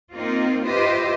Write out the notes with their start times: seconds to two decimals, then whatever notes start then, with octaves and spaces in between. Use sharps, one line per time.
0.13 A#3 C4 D#4 F4
0.66 F4 G4 B4 C5 D#5 E5